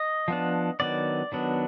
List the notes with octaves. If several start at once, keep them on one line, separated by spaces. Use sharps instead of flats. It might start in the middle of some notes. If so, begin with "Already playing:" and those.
Already playing: D#5
F3 B3 D4
D#3 F#3 B3 D4 D5
D#3 F#3 B3 D4